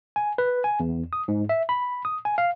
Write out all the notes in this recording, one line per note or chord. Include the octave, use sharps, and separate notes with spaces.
G#5
B4
G#5
E2
D#6
G#2
E5
B5
D#6
G#5
F5